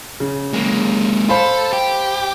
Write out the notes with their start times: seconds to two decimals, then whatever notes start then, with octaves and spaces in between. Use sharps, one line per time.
0.20 C#3
0.53 G#3 A#3
1.29 A4 C5 F5 B5
1.73 G4